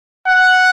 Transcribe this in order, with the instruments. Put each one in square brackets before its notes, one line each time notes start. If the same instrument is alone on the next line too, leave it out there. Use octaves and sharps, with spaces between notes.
[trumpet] F#5